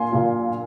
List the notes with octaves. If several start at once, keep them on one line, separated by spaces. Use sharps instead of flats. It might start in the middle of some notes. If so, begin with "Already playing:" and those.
Already playing: A#2 A#3 F4 G#5 C6
A#2 A#3 F4